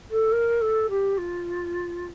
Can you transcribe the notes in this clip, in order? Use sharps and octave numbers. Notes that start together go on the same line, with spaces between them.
A4
A#4
A4
G4
F4